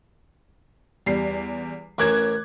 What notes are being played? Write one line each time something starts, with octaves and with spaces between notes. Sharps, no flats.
E2 G3 C7
A1 C#4 A#4 D6 F#6 G#6